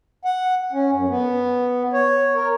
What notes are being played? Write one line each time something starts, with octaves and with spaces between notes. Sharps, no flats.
F#5
C#4
F#2
B3
C#5
A#4